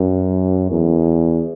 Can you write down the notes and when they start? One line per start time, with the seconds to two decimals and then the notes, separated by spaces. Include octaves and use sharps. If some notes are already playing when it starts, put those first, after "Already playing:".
Already playing: F#2
0.70 E2